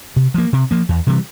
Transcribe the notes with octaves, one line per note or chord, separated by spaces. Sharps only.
C3
F3 A#3
C3
F3 A#3
E2
C3 E3 G3